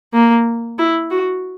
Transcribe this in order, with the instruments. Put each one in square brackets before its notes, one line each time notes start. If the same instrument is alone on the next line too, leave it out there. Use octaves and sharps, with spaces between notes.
[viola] A#3
E4
F#4